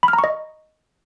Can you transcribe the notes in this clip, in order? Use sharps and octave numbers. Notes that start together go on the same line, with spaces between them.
B5
F6
A#5
C#6
D#5